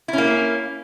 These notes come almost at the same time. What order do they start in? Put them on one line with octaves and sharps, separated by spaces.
E4 C#4 A#3